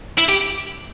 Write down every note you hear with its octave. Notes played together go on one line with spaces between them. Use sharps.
E4
G4